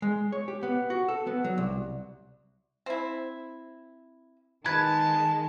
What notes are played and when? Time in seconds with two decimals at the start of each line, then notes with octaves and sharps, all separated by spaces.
0.02 G#3
0.32 C#5
0.48 G4
0.63 B3
0.90 F#4
1.08 A4
1.27 B3
1.44 F#3
1.58 C2
2.86 C4 E4
4.66 D#3 G#3 B4 A5 G#6